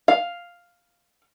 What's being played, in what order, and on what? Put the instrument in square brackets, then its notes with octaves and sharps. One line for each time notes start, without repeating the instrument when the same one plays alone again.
[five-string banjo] F5